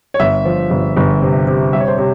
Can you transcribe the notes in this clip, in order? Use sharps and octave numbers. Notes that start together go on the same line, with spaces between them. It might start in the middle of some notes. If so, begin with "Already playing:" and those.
C#5
G1 E5
F3
G1
G1
C3
C3
G3 E5
C#5
C5
C3 C#5